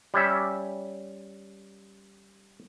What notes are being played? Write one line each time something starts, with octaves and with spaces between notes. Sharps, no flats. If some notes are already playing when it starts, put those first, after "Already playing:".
G3 C#4 E5